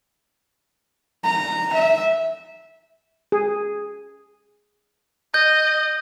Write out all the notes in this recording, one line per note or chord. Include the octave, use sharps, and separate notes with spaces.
A#5
E5
G#4
D#5 G6